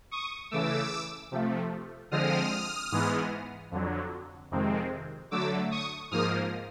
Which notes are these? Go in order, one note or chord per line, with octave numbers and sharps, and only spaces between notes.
C#6 D#6
C#3 E3 A3 D6 E6
C3 F3 A3
D3 F3 G#3 C4 D#6 F6
G#2 E3 G#3 B3
F2 D3 F#3
F2 C3 D#3 G#3 C4
D3 F#3 A3 D6 E6
C#6 D#6
G#2 F3 A#3 D#6 F6